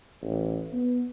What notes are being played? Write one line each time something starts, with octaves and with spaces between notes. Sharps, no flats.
A1
B3